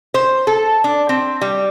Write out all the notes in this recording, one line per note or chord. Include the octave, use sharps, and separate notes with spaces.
C5
A4
D4
C4
G3